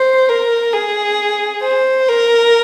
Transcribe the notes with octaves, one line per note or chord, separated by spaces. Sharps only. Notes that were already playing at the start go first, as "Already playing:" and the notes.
Already playing: C5
A#4
G#4
C5
A#4